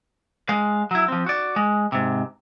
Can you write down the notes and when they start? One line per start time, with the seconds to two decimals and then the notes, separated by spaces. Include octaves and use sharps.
0.49 G#3 F5
0.91 F#3 E4
1.08 F3 C4
1.26 F#4 D5
1.56 G#3
1.92 G#2 C3